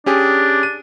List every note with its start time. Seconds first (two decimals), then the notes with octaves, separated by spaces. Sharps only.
0.06 C#4 D4 G4 G#4
0.63 D#7